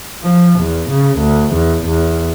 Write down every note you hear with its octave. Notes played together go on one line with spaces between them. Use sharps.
F3
E2
C#3
D2
E2
E2